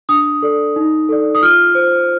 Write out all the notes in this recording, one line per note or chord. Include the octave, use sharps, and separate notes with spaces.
D4 D#6
A4 D5
D#4
A4 D5
D#6
F4 F6
C5